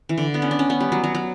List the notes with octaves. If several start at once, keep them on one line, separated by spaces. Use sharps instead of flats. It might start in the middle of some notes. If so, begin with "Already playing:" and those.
E3
D3
B3
C#4
D4
C#4
B3
G3
F#3
F#3
F#3